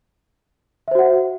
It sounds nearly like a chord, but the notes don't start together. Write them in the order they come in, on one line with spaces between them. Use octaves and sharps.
E5 C5 F#4 F#5